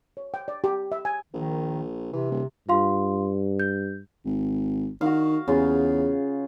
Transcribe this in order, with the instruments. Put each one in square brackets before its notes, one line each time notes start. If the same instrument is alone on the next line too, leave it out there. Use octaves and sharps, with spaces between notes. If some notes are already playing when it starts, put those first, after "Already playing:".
[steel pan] C#5
G5
D5
G4
E5
G#5
[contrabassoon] A#1 [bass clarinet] D#3
[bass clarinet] C3 [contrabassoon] E3
[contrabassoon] D#1
[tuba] G2 [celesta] F4 F5 C6
[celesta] G6
[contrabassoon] G#1
[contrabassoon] D#3 [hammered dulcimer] F#4 F5
[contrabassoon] E2 [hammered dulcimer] C#3 F4